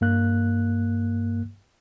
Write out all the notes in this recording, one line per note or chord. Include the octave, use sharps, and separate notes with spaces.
G2 A#3 F#6